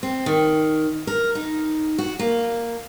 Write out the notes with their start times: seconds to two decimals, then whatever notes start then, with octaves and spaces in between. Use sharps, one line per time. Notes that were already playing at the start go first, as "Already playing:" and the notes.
0.03 C4
0.26 D#3
1.07 A#4
1.35 D#4
1.98 F#4
2.19 A#3